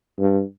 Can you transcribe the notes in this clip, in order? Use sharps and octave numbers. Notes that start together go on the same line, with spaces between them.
G2